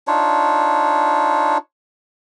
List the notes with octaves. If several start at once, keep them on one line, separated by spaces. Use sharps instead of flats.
D4 D#4 F4 C#5